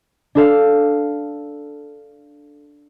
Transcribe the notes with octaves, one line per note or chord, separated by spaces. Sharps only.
D4 A4 F5